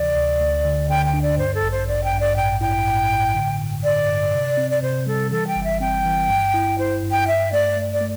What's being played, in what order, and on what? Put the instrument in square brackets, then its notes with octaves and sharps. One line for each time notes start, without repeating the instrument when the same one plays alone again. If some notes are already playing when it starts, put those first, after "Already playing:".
Already playing: [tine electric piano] D2 C3 E3 [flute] D5
[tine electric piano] D2
D2
D3
[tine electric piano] D3 [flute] G5
[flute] G5
[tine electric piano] D4
[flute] D5
[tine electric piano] G2 [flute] C5
[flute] A4
[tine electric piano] A1
[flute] C5
[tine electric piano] A1 [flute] D5
[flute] G5
[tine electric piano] G2
[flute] D5
[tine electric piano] A2 [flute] G5
[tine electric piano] E4 [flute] G5
[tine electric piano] A2
A2
D3
G2
[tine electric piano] D3 [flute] D5
[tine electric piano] G2
C3
C4
[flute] D5
[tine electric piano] C3 [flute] C5
[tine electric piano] G3 [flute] A4
[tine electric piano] E3 [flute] A4
[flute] G5
[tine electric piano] G1
[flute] E5
[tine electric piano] C4 [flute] G5
[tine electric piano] E3
G2
E4
[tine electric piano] E4 [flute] C5
[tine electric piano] G2
[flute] G5
[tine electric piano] G2 [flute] E5
[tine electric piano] A3 [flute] D5
[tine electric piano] A3
[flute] D5
[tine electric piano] A3